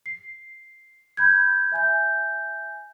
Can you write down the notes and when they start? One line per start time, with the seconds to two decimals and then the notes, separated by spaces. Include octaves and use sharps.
0.06 C7
1.17 B5 G6 G#6
1.72 E5 G#5 G6